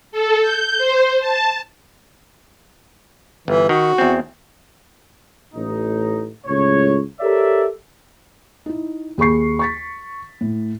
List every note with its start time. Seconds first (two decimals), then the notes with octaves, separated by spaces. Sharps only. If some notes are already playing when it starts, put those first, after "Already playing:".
0.12 A4
0.42 G6
0.78 C5
1.20 A5
3.48 G1 E3
3.69 D#3 F#4
3.98 E2 C4
5.54 A1 A2 D#4
6.46 C#2 A2 C#5
7.20 G4 A4 A#4 C#5 D5 E5
8.66 D#4 E4
9.18 D#2 G#4 B5 C#6 C7
9.59 C#6 A6 B6
10.41 A2